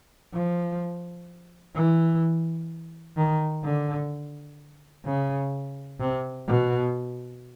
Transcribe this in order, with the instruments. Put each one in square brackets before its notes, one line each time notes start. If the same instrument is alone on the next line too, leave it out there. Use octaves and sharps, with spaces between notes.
[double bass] F3
E3
D#3
D3
C#3
C3
B2